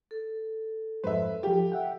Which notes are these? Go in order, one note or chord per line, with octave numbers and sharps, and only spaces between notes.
A4
F2 G#2 B4 C5 E5
F3 F4 G4
E5 F#5 G5